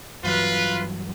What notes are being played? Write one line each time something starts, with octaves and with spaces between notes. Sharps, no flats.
G2 E3 F#3 F4 B4